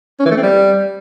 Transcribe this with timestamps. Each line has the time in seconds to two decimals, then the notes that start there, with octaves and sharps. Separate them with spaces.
0.20 C#4
0.25 E3
0.31 A3
0.37 C4
0.43 G3